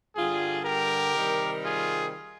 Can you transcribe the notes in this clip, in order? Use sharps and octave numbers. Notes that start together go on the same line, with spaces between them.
G2 D3 G3 F4 G#4
G4 A#4
C3 D#3 G3
F4 G#4